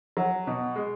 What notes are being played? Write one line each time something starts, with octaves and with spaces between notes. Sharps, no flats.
F#3
B2
G#3